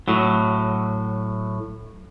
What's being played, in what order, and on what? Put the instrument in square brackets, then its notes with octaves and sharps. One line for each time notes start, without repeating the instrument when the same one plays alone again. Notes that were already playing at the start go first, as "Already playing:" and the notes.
[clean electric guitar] A2 F#3